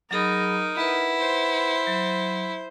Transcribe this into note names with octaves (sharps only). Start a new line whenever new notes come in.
F#3 D#4 G#4 A#4 B5
E4 B4 F#5
C5
F#3